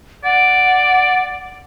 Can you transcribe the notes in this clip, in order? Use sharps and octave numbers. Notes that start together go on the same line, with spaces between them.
D5 F#5